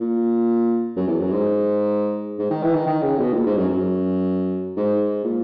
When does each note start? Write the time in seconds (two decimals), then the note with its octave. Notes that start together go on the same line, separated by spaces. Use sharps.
0.01 A#2
0.96 F#2
1.08 E2
1.20 F#2
1.32 G#2
2.39 G#2
2.51 D#3
2.63 E3
2.74 D#3
2.87 D#3
3.02 C#3
3.19 B2
3.34 A#2
3.46 G#2
3.57 F#2
3.69 F#2
4.77 G#2
5.24 A#2